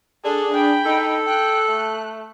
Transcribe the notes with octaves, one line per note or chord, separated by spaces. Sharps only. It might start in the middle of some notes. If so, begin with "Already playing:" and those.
D4 G#4 A4
G5 B5
D#4 A4
G5 F#6
A3